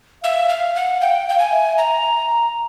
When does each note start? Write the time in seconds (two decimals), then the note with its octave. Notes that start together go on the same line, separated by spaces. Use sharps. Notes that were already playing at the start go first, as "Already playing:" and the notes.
0.23 E5 F5
0.49 F5
0.75 F#5
1.00 F5 G5
1.27 F5 G5
1.39 G#5
1.52 E5
1.78 A#5